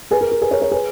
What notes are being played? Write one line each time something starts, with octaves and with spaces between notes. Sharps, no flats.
G#4 B4
A#4
A#4
G#4 B4
A#4 C#5
A#4 C#5
G#4 B4